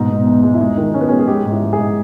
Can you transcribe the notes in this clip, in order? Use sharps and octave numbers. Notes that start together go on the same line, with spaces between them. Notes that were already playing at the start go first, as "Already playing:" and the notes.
Already playing: G#2 B2 D#4
B2
E2
G#3
E4
G#3 D#4
D#3
G#3 C#4
B3
G#3 C#4
G#4
G#3 G4
G#2
E4
G#3
G#4
G#2